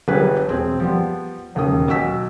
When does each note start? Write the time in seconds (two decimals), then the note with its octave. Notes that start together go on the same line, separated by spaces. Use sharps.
0.08 G1 G2 G3 G#4 B4 G#5
0.47 E1 C4 G#4
0.80 F3 G3 B3
1.55 E1 D#2 C#3 A#3 D#6
1.88 B1 F#4 E6 B6